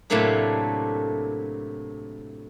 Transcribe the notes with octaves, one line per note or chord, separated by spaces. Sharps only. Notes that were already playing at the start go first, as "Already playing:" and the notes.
A2 C3 F#3 A3 A#3 D4